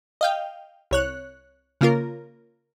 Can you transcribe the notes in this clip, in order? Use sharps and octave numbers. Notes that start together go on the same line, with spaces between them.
D#5 F5 G5
C2 C#5 F#6
C#3 A#3 F4 A#4